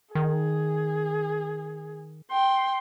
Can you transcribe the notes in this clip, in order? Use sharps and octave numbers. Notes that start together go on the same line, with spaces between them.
D#3 G#4
G5 C6